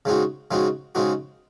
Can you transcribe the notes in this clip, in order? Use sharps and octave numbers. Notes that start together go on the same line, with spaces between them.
C#3 G#3 C4 D#4 F#4
C#3 G#3 C4 D#4 F#4
C#3 G#3 C4 D#4 F#4